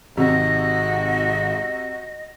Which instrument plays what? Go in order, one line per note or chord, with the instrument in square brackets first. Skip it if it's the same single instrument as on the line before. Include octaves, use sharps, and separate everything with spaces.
[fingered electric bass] G#1 [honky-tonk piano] C3 [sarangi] F#4 [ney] D#5